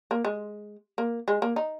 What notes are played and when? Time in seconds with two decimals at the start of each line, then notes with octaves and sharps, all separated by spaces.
0.11 A#3
0.25 G#3
0.98 A#3
1.28 G#3
1.42 A#3
1.56 D#4